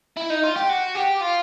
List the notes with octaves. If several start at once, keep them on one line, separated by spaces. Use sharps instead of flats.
E4
D#4
F4
G4
F#4
G4
F4